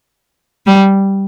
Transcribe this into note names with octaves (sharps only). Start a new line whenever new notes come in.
G3